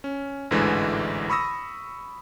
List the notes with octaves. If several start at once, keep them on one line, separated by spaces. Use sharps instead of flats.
C#4
A1 D2 G#2 D3 E3 G#3
B5 C#6 D#6 E6 A#6